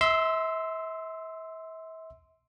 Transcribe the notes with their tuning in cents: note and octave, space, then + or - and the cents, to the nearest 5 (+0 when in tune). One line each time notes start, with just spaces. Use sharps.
E5 -35 C6 -5 E6 +0